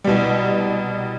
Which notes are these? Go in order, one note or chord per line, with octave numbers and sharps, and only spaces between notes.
C2 B2 G3